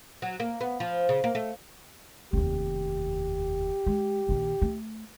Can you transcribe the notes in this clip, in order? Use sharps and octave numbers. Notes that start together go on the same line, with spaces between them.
F#3
A#3
B3
F3
C#3
A#3
A3
F1 D#2 G4
G#3
A#1 D#3
A3